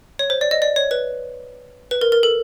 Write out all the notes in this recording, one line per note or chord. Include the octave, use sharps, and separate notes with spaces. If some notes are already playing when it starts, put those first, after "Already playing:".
C#5
C5
D5
D#5
D5
C#5
B4
B4
A#4
A#4
A4